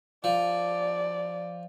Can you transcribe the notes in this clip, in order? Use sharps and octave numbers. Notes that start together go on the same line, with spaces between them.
F3 D5